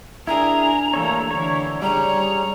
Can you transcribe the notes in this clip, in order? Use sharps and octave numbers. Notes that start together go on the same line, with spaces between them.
D4 E4 G#4 A#4 A#5
G2 E3 A3 A#3 A4 C#5
D3 E3 C#5
C#3 G3 G#4 C#5 A#5